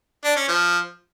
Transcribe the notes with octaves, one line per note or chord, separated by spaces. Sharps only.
D4
C#4
F3